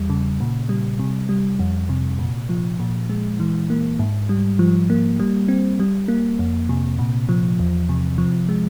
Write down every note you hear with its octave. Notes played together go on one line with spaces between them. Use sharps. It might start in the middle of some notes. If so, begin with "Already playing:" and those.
Already playing: E2 G3
C#3
A#2
G3
C3
G3
F2
C3
A#2
F3
A#2
G#3
E3
A#3
G#2
G3
F3
A#3
G3
C4
G3
A#3
F2
C3
A#2
F3
E2
C3
F3
G#3